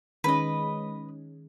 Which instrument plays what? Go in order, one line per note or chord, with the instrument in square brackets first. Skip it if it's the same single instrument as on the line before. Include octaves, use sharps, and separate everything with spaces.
[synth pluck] D#3 G#3 C#4 [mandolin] B4 D#5